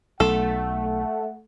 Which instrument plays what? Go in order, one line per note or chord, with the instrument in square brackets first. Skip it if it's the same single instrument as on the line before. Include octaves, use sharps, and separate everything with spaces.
[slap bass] B1 [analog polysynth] A3 [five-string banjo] A4 [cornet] F#5